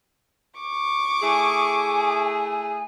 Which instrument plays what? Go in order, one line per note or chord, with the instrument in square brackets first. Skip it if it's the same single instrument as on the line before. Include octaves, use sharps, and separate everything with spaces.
[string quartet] C#6 D6
[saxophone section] A3 E4 G#4 [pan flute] G#5